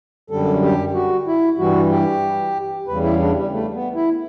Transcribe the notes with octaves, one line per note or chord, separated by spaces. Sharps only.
F#2 D3 G3 A4
G4
F#4
E4
G2 E3 G3 F#4
G4
E2 C#3 G3 B4
E4
D4
G3
A3
B3
E4